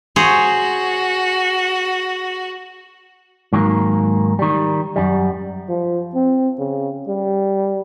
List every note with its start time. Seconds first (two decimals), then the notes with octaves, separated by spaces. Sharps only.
0.16 F#4 G#4 C5 C#5
3.53 G#2 D#3 F#3 A#3
4.39 D#3 G3
4.96 F#2 G3
5.69 F3
6.15 C4
6.59 C#3
7.08 G3